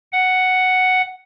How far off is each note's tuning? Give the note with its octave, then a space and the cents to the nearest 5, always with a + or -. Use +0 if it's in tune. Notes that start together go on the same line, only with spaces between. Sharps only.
F#5 +5